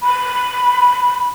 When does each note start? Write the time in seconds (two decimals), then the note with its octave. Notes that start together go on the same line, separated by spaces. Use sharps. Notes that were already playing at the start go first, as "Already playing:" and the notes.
0.02 B5